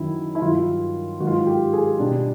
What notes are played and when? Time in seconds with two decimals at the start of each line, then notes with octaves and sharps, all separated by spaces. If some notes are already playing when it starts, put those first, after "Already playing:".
Already playing: F#2 D#3 F#3 E4
0.35 E4
0.41 G2 D#3 F#3 F4
1.20 G#2 D#3 F#3 F#4
1.27 F4
1.34 F#4
1.47 G4
1.73 G#4
1.99 B2 G3 D4